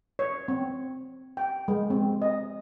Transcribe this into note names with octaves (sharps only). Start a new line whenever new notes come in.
C#5
C4
G5
G#3
C4
D#5